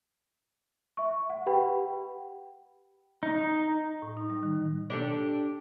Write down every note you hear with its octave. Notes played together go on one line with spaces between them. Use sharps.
E5 C#6
F#5
G4 B4 F#5 G5 B5
D#4
A2
D#4
G3
D#3
D4 G4 A4